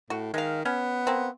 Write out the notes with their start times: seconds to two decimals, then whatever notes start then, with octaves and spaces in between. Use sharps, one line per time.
0.10 A2 F#4
0.34 D#3 G#3 F5
0.65 B3 C#4
1.07 A#3 C4